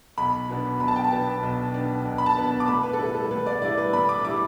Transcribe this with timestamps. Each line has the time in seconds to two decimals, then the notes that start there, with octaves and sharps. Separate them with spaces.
0.18 B1 B5
0.49 B2 B3 D4
0.80 B1 B5
0.88 A5
0.96 G5
1.04 A5
1.11 B2 B3 D4
1.43 B1
1.74 B2 B3 D4
2.06 B1
2.18 B5
2.26 A5
2.37 B2 B3 D4
2.60 D6
2.68 A2 B5
2.83 B4
2.93 A4
2.99 G3 E4 B4
3.15 A4
3.31 A2 B4
3.46 D5
3.62 G3 E4 D5
3.78 B4
3.93 A2 B5
4.09 D6
4.24 G3 E4 D6